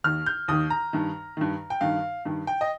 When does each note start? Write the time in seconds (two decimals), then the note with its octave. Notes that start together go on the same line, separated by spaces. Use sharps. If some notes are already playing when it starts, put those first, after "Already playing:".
0.04 D#2 D#3 F6
0.26 G6
0.48 D#2 D#3 D#6
0.70 A#5
0.93 G2 D#3
1.37 G2 D#3
1.70 G5
1.81 G2 D#3 F5
2.25 G2 D#3
2.47 G5
2.61 D#5